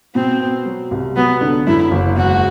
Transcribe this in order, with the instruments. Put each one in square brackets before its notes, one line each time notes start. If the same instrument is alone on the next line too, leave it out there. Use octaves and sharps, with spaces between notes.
[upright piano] B2 [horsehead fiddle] C4
[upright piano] B3
F#3
C2
[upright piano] F#3 [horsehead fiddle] B3
[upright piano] D3
[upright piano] F#2 [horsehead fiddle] E4
[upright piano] F#1
[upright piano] E1 [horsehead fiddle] F#4